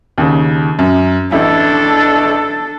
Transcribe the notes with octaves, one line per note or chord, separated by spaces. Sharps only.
D#2 C#3
F#2
A1 D4 E4 A4